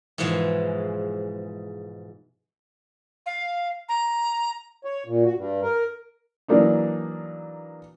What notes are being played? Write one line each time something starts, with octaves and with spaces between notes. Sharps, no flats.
G#2 B2 E3 F3 G#3
F5
A#5
C#5
A#2
F#4
G2
A#4
E3 F#3 A#3 D4 D#4